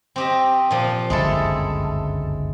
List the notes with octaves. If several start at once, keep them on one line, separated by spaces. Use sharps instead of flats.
C4 G4 D#5
A#2 F3
G1 C#2 F#2 G#3 E4 A4